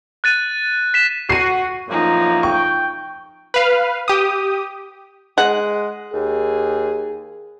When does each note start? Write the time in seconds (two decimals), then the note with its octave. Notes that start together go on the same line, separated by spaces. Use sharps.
0.24 F#6 A6 D#7
0.94 B6 E7
1.29 F#4 C7 D#7
1.88 F#2 A2 F3 A#3 D#4
2.43 G5 C#6
3.54 B4 F5
4.08 G4 D#6
5.38 G#3 F#5
6.13 D#2 G#4